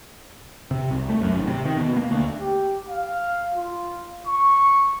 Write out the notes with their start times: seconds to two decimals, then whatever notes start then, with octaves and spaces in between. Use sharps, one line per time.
0.71 C3
0.91 C2
1.09 A3
1.22 F#2
1.35 G#1
1.47 C3
1.65 D#3
1.77 B2
1.96 A#3
2.11 D2
2.40 G4
2.89 F5
3.54 F4
4.26 C#6